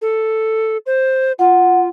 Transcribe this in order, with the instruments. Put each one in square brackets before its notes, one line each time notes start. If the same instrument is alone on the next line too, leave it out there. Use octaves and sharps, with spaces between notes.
[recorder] A4
C5
[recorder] F4 [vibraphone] F#5